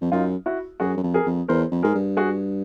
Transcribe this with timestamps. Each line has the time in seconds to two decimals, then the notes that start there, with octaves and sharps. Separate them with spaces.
0.01 F2
0.12 F#2 D#4 F4
0.46 E4 F#4
0.80 F#2 F#4 G#4
0.97 F#2
1.03 F2
1.14 G#4 A#4
1.26 F2
1.48 E2 A#4 C5
1.71 F2
1.83 G#2 G#4 A#4
1.95 G2
2.17 F#4 G#4